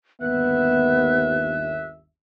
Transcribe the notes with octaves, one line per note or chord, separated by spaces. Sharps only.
G1 D#2 B3 E5 F#6